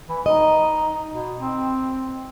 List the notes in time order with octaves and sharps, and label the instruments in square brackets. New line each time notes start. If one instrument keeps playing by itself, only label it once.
[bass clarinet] E3
[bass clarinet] D#4 [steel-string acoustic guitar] D#5
[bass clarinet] B2
C4